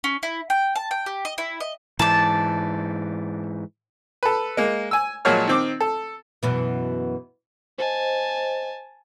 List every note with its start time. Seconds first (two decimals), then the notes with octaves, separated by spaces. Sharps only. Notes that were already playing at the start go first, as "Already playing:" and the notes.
0.04 C#4
0.23 E4
0.50 G5
0.76 A5
0.91 G5
1.06 G4
1.25 D#5
1.38 E4
1.60 D#5
1.99 G#2 E3 D5 A5
4.23 A4 B4
4.57 G#3 A#3
4.91 G#5 E6
5.25 A#2 F3 F#3 G#3 C#5 F6
5.48 D#3 C4 D6
5.81 A4
6.43 F#2 B2 E3
7.78 C5 D#5 G#5 A5